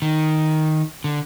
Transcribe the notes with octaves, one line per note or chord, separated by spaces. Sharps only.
D#3
D3